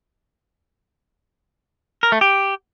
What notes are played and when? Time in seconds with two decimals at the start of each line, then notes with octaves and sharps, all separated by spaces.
2.03 A#4
2.12 A3
2.21 G4